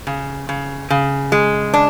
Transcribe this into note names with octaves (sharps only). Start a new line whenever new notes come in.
C#3
C#3
C#3
G#3
D4